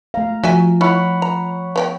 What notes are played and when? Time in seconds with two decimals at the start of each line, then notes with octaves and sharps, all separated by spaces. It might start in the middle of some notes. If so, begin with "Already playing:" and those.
0.14 A3 F5 A#5
0.44 F3 F#4 E5 G#5
0.81 E4 C#5 F#5 B5
1.22 A#5
1.76 B3 C4 G5